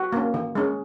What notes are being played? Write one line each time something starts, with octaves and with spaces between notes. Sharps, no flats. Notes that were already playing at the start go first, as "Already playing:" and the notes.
Already playing: F#4
A#3 C#4
D#3
G#3 C#4